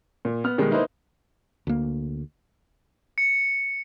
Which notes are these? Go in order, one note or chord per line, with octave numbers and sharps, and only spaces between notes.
A#2
B3 F6
B2 D#3 G3 G#3
A#3 D#4 E4 B4 C5
D2 A#3
C#7